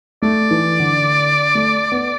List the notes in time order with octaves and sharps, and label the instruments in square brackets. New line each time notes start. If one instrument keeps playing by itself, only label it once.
[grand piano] A3 [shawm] D5
[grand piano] E3
D3
A3
B3